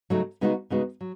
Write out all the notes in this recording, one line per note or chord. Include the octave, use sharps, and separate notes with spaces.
C#3 F#3 A3 D#4
C#3 G#3 B3 D#4 F#4
C#3 G#3 B3 D#4 F#4
F#3